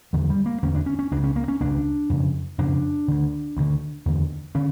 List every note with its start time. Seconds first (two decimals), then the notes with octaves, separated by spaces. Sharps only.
0.13 E2 D3 F3
0.30 G3
0.46 A#3
0.63 E2 D3 C#4
0.75 D4
0.86 C#4
0.99 C#4
1.11 C#2 C#3 D4
1.24 C#4
1.36 A#3
1.48 C#4
1.60 C#2 C#3 D4
2.10 F2 C#3
2.58 F2 C#3 D4
3.08 D2 D3
3.57 D2 D3
4.06 E2 D3
4.55 D3 C#4